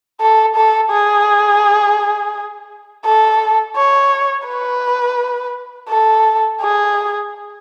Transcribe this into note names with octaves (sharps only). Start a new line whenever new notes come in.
A4
A4
G#4
A4
C#5
B4
A4
G#4